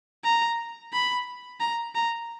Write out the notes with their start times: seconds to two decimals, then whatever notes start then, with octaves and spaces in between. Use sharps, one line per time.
0.24 A#5
0.93 B5
1.60 A#5
1.95 A#5